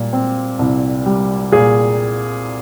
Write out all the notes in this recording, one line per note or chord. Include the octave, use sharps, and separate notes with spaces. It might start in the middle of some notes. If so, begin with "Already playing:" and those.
Already playing: A#2 G3
C4
C2
G3
A#2 G#4